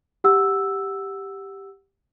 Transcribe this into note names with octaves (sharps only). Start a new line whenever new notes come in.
G4 F#5 E6